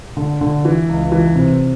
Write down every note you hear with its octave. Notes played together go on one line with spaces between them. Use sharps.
D3
D3
E3
C#2
E3
C3